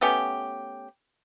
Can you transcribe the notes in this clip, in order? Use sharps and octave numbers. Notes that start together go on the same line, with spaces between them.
A3 B3 C#4 G4